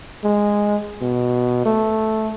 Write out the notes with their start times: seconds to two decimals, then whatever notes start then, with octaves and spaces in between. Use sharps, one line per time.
0.24 G#3
1.02 B2
1.66 A3